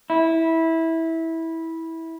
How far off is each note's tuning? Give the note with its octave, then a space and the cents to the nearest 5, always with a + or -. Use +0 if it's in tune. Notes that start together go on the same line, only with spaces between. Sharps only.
E4 -15